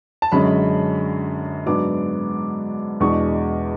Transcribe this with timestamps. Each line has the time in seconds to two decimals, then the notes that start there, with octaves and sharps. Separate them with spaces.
0.22 A5
0.32 F#2 D3 G#3 C#4 B5
1.66 G#2 F#3 B3 D4 D6
3.00 E2 B2 G#3 D4 C#6